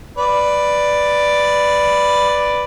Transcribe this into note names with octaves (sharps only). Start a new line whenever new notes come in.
B4 D5